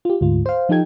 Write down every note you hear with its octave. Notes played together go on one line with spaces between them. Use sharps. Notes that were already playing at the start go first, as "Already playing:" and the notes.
F4 G4
D2 G#2 F4
C5 F5
F3 D#4 G4 A4 G5 G#6